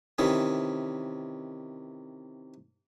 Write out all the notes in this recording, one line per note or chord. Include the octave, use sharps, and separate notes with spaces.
C3 D#3 E3 C#4